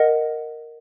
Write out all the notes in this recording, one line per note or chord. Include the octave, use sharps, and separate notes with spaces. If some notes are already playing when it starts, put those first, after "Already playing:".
Already playing: A#4 D#5 F#5